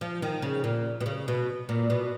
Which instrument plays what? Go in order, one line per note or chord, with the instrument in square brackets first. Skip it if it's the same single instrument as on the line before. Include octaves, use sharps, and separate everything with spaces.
[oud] F3
D#3
C#3
A#2
B2
C#3
B2
A#2
B2